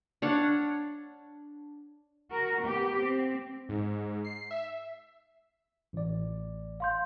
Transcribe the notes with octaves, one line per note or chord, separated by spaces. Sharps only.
D4 C#5 F5 F#5
F#4 A#4
B3 G4
C4
G#2
C7
E5
A1 D5
F5 C6 G6